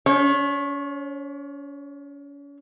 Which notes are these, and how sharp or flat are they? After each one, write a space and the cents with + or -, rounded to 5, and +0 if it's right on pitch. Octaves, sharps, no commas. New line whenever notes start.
C#4 +40 C#5 -25